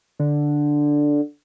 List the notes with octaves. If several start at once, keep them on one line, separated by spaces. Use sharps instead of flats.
D3